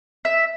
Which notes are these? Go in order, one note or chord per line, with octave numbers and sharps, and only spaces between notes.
E5